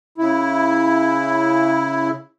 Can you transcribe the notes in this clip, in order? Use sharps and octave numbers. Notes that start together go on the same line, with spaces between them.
C#3 E4